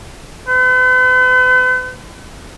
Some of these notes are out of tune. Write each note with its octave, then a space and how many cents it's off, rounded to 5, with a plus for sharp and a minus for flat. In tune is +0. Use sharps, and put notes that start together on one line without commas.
B4 +45